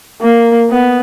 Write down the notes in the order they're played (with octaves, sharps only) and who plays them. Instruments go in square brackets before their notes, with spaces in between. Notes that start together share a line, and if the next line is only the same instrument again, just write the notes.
[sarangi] A#3
B3